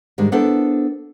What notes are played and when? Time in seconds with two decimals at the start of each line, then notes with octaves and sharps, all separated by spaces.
0.18 G#2 D#3 G3 G#3 D4
0.32 B3 D4 E4 A4 A#4 C5